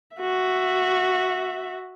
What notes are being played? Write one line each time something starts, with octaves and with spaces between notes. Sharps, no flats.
F#4 E5